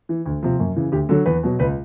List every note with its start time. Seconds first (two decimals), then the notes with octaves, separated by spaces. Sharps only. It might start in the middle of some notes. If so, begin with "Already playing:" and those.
0.09 E3
0.26 D2
0.43 C3 F3
0.59 F#2
0.76 C#3 E3
0.92 D2 G4
1.09 D3 F#3 A4
1.26 E2 B4
1.43 B2 F#3
1.59 C#2 B4